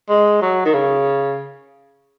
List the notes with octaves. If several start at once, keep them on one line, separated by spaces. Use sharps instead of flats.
G#3
F#3
D#3
C#3